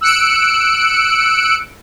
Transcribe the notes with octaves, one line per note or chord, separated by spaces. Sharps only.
E6 F#6 C#7 D7